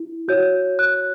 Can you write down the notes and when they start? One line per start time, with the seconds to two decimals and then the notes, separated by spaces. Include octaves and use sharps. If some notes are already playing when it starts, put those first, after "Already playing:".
Already playing: E4
0.28 F#4 C#5 G6
0.79 F#6